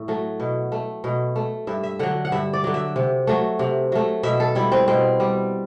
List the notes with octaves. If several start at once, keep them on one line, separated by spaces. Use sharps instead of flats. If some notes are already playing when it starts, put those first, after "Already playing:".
Already playing: A2
F#3 A3
B2
A3
B2
A3
G2 E5
E5
D3 F#3 F#5
F#5
G2 E5
D5
D3 F#3
E5
C3
F#3 A3
C3
F#3 A3
B2 E5
A4
G3 E4
C4
B2 C4
G3